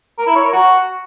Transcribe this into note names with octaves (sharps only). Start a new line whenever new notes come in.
A#4
E4
C#5
A#4
F#4